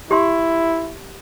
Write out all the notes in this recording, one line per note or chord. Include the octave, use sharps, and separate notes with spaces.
E4 G4 C6